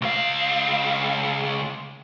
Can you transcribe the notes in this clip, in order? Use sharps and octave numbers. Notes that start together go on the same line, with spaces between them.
C#2 F5